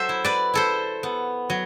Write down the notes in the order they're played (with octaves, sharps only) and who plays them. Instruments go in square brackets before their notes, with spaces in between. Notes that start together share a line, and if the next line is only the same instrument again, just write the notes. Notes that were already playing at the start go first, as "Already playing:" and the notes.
Already playing: [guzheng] F#3 A4 C5 E5
E4
B4 D5
E4 A4 C5
B3
F#3